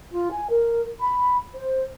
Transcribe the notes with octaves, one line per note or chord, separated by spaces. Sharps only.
F4
G#5
A#4
B5
C5